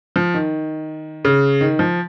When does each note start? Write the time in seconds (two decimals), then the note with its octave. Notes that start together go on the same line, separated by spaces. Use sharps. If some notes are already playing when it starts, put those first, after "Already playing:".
0.16 F3
0.34 D#3
1.25 C#3
1.61 D#3
1.79 F3